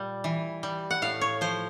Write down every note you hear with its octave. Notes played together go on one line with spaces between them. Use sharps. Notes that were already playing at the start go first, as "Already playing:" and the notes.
Already playing: A#2 G3
E3
G3
F#5
A2 F5
C#5
F3 C5